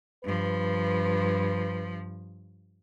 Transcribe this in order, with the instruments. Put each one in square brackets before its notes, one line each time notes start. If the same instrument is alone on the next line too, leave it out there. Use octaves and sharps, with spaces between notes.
[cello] G2 F3 [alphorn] B4